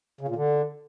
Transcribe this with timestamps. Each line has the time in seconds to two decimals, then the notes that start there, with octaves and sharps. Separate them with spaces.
0.21 C#3
0.28 A#2
0.36 D3